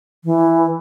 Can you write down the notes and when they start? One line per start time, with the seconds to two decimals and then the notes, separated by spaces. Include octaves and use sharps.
0.24 E3